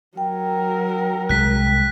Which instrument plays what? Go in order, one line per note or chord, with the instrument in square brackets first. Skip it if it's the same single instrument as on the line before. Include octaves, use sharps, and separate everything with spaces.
[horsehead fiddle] F#3 A#4 [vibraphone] G5
[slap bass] C2 G#3 [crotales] F#6 B6